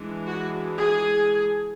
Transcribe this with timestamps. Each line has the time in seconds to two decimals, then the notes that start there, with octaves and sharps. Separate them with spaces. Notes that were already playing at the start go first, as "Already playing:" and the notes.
Already playing: E3 G#3 D4
0.26 F#4
0.78 G#4